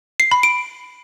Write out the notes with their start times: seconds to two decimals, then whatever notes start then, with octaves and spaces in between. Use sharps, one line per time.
0.20 C7
0.31 B5
0.43 D7